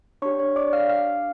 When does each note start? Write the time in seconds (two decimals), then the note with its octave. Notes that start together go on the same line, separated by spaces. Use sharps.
0.22 D4 G4 C#5 C#6
0.39 C#5 C#6
0.56 D5 D6
0.73 F5 F6
0.89 F5 F6